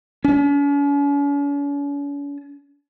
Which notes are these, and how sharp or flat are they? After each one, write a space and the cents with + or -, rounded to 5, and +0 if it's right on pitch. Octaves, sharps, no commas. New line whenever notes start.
C#4 +45